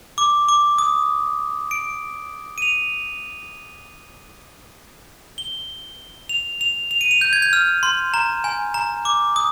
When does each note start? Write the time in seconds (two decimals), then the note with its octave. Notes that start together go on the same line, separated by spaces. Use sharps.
0.18 D6
0.49 D6
0.78 D#6
1.71 D7
2.58 D#7
2.62 F7
5.38 G7
6.29 F7
6.61 F7
6.91 F7
7.01 D#7
7.11 F7
7.21 G6
7.33 G#6
7.42 G6
7.53 F6
7.83 C6
8.14 A#5
8.44 G#5
8.74 A#5
9.05 D6
9.36 D#6